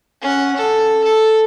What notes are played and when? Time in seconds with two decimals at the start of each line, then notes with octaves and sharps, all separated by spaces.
0.22 C#4 F#5
0.56 A4
1.04 A4